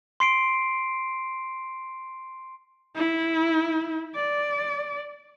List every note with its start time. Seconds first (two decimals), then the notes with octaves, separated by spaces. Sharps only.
0.20 C6 C7 D7
2.95 E4
4.15 D5